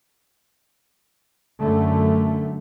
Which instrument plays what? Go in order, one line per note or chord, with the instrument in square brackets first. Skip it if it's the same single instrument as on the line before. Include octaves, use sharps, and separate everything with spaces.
[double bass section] F#2 D3 A3